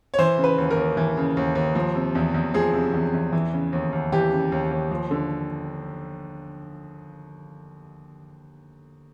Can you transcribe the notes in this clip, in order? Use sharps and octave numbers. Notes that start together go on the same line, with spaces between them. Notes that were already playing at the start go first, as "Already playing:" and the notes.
C#5
E3 C5
C#3
B4
D#2
A#4
D#2
E3
C#3
D#2
D#2
F3
C3
E2
E2
F3 G#4
C3
E2
E2
E3
C#3
D#2
D#2
E3 G4
C#3
D#2
D#2
F3
D3